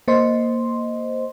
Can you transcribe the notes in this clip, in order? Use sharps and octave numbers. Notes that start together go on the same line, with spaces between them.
A#3 C5 D#5 C6